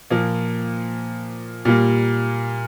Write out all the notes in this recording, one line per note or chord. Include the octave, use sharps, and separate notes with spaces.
A#2 F3 A#3
A#2 G3 A#3